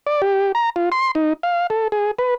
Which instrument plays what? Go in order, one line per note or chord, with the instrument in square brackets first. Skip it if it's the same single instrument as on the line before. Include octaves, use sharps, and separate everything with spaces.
[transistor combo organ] D5
G4
A#5
F4
C6
D#4
F5
A4
G#4
B4